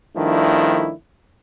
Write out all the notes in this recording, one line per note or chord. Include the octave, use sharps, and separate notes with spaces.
G2 D#3 F3 A3 D4 E4